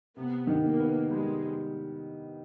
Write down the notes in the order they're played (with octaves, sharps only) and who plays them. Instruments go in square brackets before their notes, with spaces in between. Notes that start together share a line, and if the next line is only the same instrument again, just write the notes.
[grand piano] C3 [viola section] B3
[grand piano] D#3
[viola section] A#3
[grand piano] B3
[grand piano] G3 [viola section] G#3